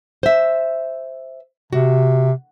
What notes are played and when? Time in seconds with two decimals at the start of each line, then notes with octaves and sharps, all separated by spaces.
0.23 C5 E5
1.73 C3 F#4